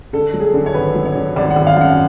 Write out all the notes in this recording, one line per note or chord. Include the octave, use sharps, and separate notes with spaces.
D3 A4
F#3
G#4
A4
D3
C#5
G#1 B4
F#3
C#5
D3
G#1 D5
F#5
G#1
F5
F#2 F#5